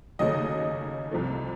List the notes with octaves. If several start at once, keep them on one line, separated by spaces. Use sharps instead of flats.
D#2 C#3 F#3 A3 D#5
C2 C3 F3 A3